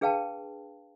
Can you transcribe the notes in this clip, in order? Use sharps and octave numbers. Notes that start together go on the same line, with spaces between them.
D4 G#4 B4 F5 G5 A5